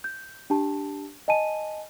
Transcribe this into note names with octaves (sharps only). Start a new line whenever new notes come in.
G6
D4 G4 A5
D#5 G#5 A5 D#7